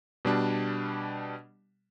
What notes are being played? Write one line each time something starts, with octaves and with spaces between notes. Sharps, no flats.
B2 G3 D4